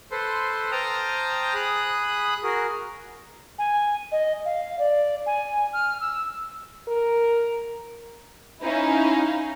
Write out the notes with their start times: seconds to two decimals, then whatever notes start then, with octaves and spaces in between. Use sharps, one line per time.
0.12 A4 B4 C5 C6
0.72 C5 G5 A5 A#5 D#6 F6
1.54 G#4 B5 D#6 F#6
2.44 F#4 G#4 A#4
3.58 G#5
4.12 D#5
4.45 F5
4.79 D5
5.26 G#5
5.73 F6
6.00 E6
6.88 A#4
8.63 C#4 D#4 E4 F5